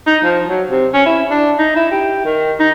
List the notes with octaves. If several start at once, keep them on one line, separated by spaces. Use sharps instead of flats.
D#4
F3
F#3
C3
C#4
E4
D4
D#4
E4
G4
D#3
D#4